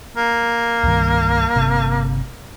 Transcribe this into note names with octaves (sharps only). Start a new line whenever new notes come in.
A#3
C2 G2 D#3
G1 C3